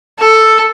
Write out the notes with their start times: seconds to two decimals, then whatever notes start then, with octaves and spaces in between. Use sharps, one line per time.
0.19 A4